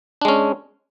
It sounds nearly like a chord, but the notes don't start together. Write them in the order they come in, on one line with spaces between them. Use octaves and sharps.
D4 G#3 C#4